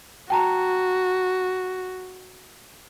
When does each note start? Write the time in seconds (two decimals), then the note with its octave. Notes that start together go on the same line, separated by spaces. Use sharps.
0.30 F#4 G5 A5 A#5